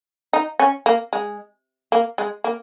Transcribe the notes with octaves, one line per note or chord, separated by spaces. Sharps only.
D#4
C#4
A#3
G#3
A#3
G#3
A#3